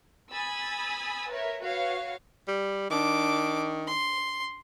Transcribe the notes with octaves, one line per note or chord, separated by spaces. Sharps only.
G#5 B5 D#6 E6 A6
A#4 B4 C#5 E5
F#4 B4 C#5 F5
G3
D#3 D4 D6
C6